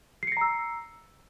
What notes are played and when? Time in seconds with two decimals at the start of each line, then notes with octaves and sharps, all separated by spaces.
0.23 C7
0.27 C#7
0.32 A#6
0.37 A#5
0.41 E6